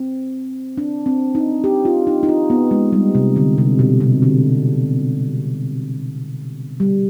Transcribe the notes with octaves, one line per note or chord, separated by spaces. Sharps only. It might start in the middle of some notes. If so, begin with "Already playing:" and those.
Already playing: C4
D4
C4
D#4
G4
F4
D#4
D#4
F4
B3
G#3
G3
C3
D3
C3
B2
C3
D3
G3